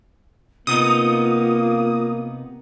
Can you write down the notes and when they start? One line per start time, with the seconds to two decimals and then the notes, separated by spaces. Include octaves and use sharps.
0.67 C3 A#3 B3 D#4 F4 D#6